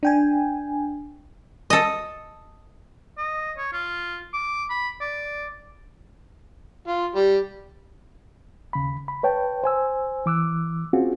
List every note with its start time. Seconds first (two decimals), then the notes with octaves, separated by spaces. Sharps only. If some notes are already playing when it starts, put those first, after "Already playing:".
0.03 D4 G5 G#5
1.70 A4 D#5
3.18 D#5
3.57 C#5
3.73 F4
4.33 D6
4.70 B5
5.01 D5
6.87 F4
7.15 G3
8.73 D#2 C#3 B5
9.08 B5
9.23 B4 C#5 G5 A5
9.64 C5 G#5 E6
10.26 E3 D6 E6 F#6
10.93 C4 C#4 F4 F#4 G#4